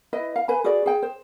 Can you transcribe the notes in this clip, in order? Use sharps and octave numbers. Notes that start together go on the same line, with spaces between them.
E4 B4 D#5
F5
B4 G#5 B5
F#4 G#4 B4 D5
G#4 G5
C5